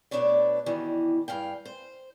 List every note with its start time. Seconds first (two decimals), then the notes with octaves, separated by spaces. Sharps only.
0.11 B2 A3 D4 B4 C#5 D5
0.66 B2 D#3 E3 G3
1.28 G2 G#4 F5 G5
1.66 C5